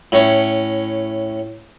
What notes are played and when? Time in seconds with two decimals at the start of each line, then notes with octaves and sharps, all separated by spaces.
0.12 A2 C#4